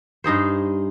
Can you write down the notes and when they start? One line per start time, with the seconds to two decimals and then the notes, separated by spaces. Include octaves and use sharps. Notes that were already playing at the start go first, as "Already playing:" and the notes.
0.24 G2 D#4 G#4 C5